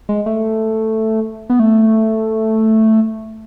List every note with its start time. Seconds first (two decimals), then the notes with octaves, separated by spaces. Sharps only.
0.09 G#3
0.26 A3
1.50 B3
1.60 A3